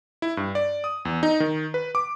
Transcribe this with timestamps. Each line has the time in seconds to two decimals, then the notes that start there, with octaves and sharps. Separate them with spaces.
0.22 E4
0.37 G2
0.55 D5
0.84 D#6
1.05 E2
1.23 D#4
1.40 D#3
1.74 B4
1.95 D6